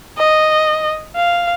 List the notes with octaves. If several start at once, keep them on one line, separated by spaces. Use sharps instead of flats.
D#5
F5